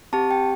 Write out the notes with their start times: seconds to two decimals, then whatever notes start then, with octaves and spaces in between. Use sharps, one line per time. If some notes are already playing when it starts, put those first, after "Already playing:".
0.13 C4 G4 A5
0.31 G5